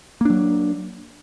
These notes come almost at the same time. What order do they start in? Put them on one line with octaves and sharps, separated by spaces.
A#3 D4 F#3